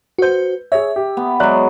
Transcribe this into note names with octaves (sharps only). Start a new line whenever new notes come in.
F#4 B4 C5 G6
G#4 C#5 E5
G4
B3
F#3 G#3 D5 E5 F#6